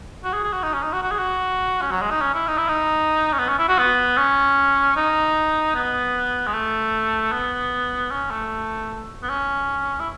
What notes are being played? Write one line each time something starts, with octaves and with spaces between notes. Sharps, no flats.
F#4
G#4
G#4
F#4
D#4
C#4
D#4
F#4
F#4
G#4
F#4
C#4
F#3
G#3
D#4
C#4
E4
D#4
E4
D#4
C#4
B3
C#4
E4
F#4
B3
C#4
D#4
B3
G#3
A3
B3
C#4
A3
B3
C#4
E4